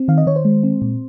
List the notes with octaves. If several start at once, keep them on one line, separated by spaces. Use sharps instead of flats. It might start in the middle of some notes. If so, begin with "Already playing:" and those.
Already playing: C4
D#3 F5
D#5
D#3 C#5
C5
G#3
C4
A#2